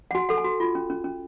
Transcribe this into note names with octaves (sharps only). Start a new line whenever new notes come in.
F#5
F#4 G#5
A4 F#5
G#5
F#4
F4
C#4
C#4
C#4